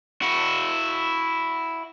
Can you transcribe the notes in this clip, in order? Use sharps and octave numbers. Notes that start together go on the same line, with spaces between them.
E4 F#4